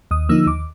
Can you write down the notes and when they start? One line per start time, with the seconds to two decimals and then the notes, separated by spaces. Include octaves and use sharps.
0.11 D#2 D#6
0.29 D3 F3 A#3 D#4 E6
0.46 D#2 D6